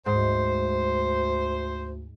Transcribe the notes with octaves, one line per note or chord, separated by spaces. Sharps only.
D2 G#2 C5